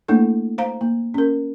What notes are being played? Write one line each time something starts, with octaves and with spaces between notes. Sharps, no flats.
A3 A#3 D4 E4 A4
C5 F5 A#5
A#3
C#4 A#4